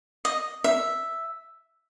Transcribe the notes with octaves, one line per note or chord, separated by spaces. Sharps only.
D#5
E5